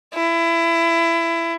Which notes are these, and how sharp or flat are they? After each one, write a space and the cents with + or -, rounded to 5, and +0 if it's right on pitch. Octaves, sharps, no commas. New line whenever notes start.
E4 +20